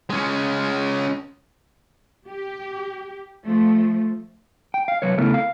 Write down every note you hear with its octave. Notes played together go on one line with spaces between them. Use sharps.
G#3 C#4
G4
F3 A3
G5
F5
C2 F#3 B4 C#5
C#3 A3 B3 E4 A4 A#4
F5